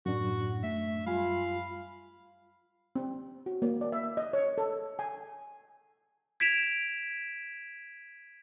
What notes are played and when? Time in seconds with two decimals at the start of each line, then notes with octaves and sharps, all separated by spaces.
0.06 F#2 A2 D4 F#4
0.63 A3 E5
1.06 F#2 G3 F4 F5 G#5 B5
2.96 C4
3.46 F#4
3.62 A#3
3.81 D5
3.92 E5
4.17 D#5
4.33 C#5
4.58 A4
4.99 G#5
6.40 G#6 B6 D7 E7 F7